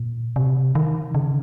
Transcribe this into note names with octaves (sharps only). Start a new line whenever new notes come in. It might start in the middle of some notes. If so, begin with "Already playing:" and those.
Already playing: A#2
C3
D#3
C#3